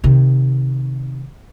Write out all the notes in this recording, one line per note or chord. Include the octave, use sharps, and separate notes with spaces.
C3 D#3